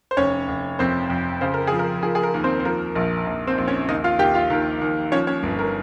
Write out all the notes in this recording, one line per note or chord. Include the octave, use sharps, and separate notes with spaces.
C5
F1 C#4 C#5
F1
F2 C4 C5
F2
C#3 C5
A#4
F3 G#4
A#4
F3 G#4
G#4
A#4
D#2
C4 C5
C5
F3 A#4
A#1
A#1
C4 C5
A#1
C#4 C#5
D#2 D#4 D#5
F4 F5
D#2 G4 G5
F4 F5
D#2 A#4
D#2
F3 C#4 C#5
C#4 C#5
G1
A#4